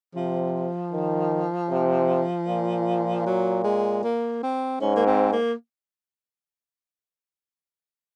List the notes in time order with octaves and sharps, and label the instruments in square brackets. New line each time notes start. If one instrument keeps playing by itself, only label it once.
[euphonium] C3 [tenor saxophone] F3
[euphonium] D#3
C3
A#2
[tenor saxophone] F#3
G#3
A#3
C4
[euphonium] G#2 [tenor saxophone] C#4
[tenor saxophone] A#3
C4
A#3